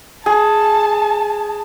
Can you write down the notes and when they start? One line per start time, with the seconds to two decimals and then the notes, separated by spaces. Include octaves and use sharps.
0.26 G#4 A5